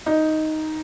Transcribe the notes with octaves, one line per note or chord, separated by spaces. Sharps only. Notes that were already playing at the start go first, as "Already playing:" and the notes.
D#4